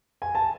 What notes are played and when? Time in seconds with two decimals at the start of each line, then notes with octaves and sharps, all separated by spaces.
0.22 G#5
0.35 A5